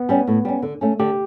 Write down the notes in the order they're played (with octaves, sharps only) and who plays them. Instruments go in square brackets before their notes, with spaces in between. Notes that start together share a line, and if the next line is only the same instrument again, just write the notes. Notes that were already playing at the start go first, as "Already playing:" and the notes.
Already playing: [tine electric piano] B3
[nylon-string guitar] G3 C#4
A2
G3 C#4
D3
A3 C#4
[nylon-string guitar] D3 [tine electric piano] G4